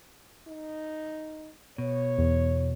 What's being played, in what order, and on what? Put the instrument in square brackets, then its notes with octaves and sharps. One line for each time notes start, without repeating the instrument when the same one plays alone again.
[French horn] D#4
[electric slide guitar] B2 [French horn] C#5
[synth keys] E2